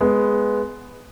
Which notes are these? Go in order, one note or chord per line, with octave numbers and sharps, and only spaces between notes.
G#3 B3